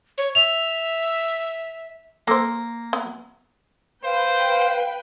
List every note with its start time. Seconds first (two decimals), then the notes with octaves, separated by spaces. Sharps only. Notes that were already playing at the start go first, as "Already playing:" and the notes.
0.18 C#5
0.35 E5 F7
2.28 A#3 A4 C5
2.93 B3
4.04 B4 C5 F5 G5